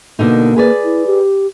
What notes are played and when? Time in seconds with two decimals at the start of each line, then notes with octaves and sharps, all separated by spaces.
0.19 B2 D3 A#3 D#4
0.56 G#4 B4 D5
0.84 E4
1.06 G4